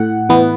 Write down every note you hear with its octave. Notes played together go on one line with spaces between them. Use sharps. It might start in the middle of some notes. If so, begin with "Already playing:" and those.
Already playing: A2 F#5
E3 B3